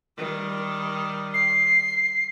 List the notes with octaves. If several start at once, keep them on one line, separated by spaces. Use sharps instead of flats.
D#3 G3
C7